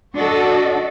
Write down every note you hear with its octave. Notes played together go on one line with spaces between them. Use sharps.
D4 F#4 A4 D#5